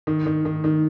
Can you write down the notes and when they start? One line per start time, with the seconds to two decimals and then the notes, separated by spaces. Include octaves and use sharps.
0.07 D#3
0.26 D#3
0.45 D#3
0.64 D#3